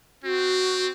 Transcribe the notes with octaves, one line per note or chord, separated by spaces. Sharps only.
C4 F#4